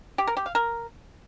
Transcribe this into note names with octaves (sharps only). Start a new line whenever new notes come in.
G4
A#4
G4
F5
A#4